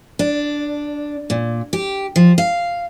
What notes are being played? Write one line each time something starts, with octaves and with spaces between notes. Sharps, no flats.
D4
A#2
G4
F3
F5